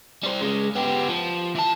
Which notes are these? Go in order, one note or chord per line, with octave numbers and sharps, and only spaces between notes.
G3 C5
C#3 G#3
B3 G4
F3
E3 A5